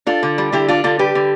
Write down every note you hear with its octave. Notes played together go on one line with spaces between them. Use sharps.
D4 F4 A4
D3
G3
D3 E4 G4
D4 F4 A4
D3 F4 A4
G3 G4 B4
D3